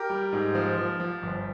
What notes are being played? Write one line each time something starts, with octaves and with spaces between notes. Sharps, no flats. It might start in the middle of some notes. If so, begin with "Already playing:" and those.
Already playing: G4 A#4
G3
G#2
F3
F3
F3
G1